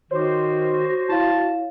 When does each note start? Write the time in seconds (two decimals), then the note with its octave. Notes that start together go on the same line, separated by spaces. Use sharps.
0.11 D#3 F#4 C5 C#5 D6
1.09 E4 C#5 F5 A5